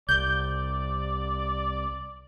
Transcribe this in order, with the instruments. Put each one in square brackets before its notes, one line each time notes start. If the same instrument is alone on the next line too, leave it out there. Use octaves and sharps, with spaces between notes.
[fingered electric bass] C2 [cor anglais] D5 [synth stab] G6